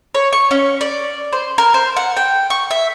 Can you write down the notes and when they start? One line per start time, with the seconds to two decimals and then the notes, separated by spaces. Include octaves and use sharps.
0.15 C#5
0.33 C#6
0.51 C#4
0.81 D5
1.33 C5
1.58 A#4
1.74 C5
1.96 F#5
2.16 G5
2.50 C#6
2.71 E5